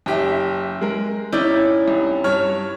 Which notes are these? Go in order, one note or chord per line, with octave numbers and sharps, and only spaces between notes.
F#1 G4 E5
G#3 A#4
C#4 D#4 E4 D5 G6
C2
G2 C#5 F6